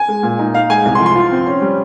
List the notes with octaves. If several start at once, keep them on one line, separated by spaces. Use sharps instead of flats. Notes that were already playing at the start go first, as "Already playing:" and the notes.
Already playing: G#5
G#3
A#2
D#4
D#4 F5
G#3 G#5
C2
C6
F3
C6
F4
C4
C#4
G3